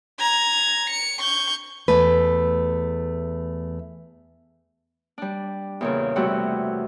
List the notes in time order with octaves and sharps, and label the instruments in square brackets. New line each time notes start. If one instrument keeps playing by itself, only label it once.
[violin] A#5 G#6
C#7
C#6 G6
[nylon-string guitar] E2 A3 B4
[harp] G3 D4
E2 A#2 C#3
E2 C3 G3 A3 F#4